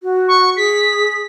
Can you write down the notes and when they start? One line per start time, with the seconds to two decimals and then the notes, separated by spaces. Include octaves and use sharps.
0.02 F#4
0.28 C#6
0.56 G#4 B6